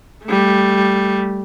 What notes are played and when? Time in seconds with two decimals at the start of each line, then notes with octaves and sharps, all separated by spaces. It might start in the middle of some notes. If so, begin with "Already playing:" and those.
0.25 G3 A3